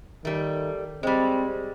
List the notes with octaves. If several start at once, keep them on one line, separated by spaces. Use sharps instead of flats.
D#3 G3 A3
G3 G#3 C4